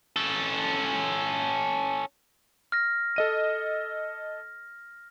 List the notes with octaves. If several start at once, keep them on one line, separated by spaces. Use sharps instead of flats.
C#4 A4
F6 A#6
A4 D#5 D#7